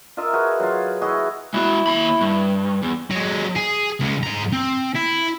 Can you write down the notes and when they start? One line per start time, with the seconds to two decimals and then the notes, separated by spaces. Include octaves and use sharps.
0.17 F4 A#4 D#5 E5
0.33 F#4 G#4 B4
0.60 F#3 F4
1.01 E4 F#4 G#4 D#5
1.54 G#3 E4 F#4
1.87 D#2 B5
2.21 G2
2.82 E2
3.11 F#3 G#3
3.56 G#4
4.00 C#2 C#3
4.23 G#2 A#5
4.52 C4
4.95 E4